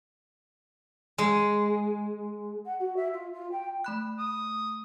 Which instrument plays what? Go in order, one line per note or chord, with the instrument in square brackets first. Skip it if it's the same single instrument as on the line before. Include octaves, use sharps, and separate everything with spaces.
[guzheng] G#3
[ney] F#5
F#4
E5
F4
F4
G5
[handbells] A3 B5 F#6
[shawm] D#6